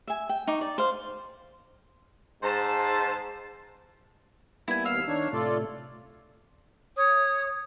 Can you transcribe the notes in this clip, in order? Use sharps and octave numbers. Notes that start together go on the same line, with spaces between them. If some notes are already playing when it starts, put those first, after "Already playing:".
E5 G#5
G5
D#4 C#6 D6
D5
C5 F5
G#2 C5 A5
G3 A#3 B3 E4 G#5
D#2 F5 E6 F6
D#3 D4 D#4 C#5
A2 C3 A3 F4 A4 D5
C#5 D#6